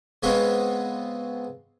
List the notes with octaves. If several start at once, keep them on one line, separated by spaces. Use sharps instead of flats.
C#3 G#3 B3 C4 C5 C#5